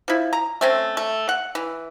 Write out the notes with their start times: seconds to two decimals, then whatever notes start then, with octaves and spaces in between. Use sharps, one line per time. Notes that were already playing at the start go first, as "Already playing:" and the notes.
0.08 F3 E4
0.33 A#5
0.61 A3 C4 C#4
0.97 A3
1.29 F#5
1.55 E3